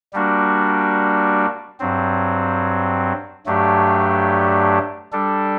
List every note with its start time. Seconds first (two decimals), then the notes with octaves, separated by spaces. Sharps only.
0.13 G3 A#3 D4 F#4
1.80 G2 F#3 C4
3.46 G2 F#3 A3 D4 G4
5.13 G3 D4 A4